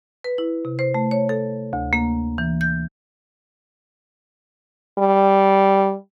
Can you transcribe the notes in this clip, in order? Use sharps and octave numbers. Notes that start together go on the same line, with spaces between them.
B4
E4
C3
C5
A3
C#5
A4
D2
A#3
E3
G6
G3